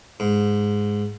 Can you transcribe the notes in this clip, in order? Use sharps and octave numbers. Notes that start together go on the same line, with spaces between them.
G#2